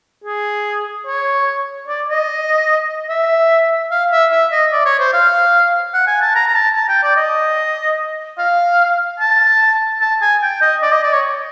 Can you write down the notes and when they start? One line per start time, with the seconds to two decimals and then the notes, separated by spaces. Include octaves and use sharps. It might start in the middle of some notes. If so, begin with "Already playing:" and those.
0.24 G#4
1.06 C#5
1.87 D5
2.08 D#5
3.09 E5
3.91 F5
4.11 E5
4.32 E5
4.52 D#5
4.72 D5
4.86 C#5
4.99 C5
5.13 F5
5.94 F#5
6.07 G#5
6.21 A5
6.35 A#5
6.47 A#5
6.55 A5
6.76 A5
6.89 G5
7.03 D5
7.17 D#5
8.39 F5
9.20 A5
10.01 A5
10.22 G#5
10.42 G5
10.62 D#5
10.82 D5
10.92 D#5
11.03 D5
11.13 C#5